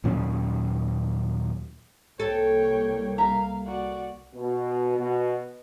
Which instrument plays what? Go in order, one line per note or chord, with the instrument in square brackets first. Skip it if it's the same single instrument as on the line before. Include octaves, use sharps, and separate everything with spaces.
[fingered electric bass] D#2 A#2 F#3 C#4
[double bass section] C2 G3 A#3 [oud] A4 [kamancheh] C#5 G5
[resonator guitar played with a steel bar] E5 A#5 [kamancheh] F5
[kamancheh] F#4 D5
[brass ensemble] B2
B2